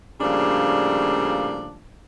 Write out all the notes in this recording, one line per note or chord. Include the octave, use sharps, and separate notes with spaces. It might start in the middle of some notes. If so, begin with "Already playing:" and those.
A2 C#3 F3 G3 A#3 D4